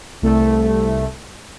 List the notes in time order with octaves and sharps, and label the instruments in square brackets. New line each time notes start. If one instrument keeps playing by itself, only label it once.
[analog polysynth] C2 A3